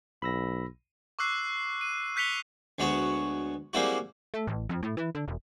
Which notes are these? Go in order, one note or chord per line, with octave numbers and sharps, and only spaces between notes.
B1 B5 E6 A#6
C#6 D6 E6 F#6 C7
D#7
F#6 G6 B6 C#7 F7 G7
D2 G#3 B3 F#4 C#5
G3 G#3 A#3 C4 E4 F#4
A3
A1
F2
A2
E3
D3
E1